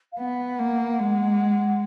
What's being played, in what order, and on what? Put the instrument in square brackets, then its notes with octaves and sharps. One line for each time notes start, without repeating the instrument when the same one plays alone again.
[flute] F5
[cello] B3 [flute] F#5
[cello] A#3
G#3